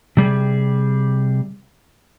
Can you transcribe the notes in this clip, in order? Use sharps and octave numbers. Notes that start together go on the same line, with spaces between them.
C3 G3 G#4